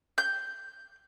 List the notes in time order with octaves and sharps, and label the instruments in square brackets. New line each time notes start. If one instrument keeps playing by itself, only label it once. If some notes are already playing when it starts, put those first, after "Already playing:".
[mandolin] G6